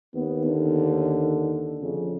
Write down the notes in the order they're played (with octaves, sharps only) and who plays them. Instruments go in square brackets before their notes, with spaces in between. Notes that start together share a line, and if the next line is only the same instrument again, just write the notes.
[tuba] D#2 [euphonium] B3
[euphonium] D3
[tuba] F2 [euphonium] C#3